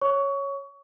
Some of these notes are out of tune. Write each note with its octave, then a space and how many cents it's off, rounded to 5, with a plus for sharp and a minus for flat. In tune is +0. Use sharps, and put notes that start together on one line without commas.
C#5 +0 C#6 +25